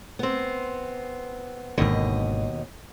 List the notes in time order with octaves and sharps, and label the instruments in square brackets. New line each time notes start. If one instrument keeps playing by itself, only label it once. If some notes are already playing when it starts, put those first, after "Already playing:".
[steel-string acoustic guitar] B3 C4
[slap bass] G#1 G#2 D3 [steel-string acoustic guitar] D#2 B2 D#5